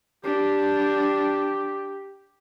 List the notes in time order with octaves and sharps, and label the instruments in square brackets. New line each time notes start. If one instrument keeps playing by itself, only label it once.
[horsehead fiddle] D4 [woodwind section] G4